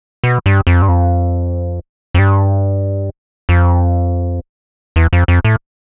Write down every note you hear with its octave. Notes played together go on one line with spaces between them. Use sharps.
B2
G2
F2
G2
F2
F2
G2
F2
E2
F2
F2
A2